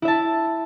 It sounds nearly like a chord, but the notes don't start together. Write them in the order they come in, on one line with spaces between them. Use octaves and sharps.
E4 E5 A5